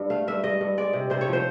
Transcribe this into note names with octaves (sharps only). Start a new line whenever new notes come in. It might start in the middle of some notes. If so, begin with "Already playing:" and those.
Already playing: G2
A3 F5
G2 E5
G2 D#5
G2
G#3 D5
C3
C3 C5
C#5
F3
C5